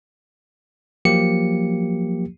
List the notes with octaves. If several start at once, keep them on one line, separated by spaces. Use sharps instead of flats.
F3 F#3 A#3 G4 C#7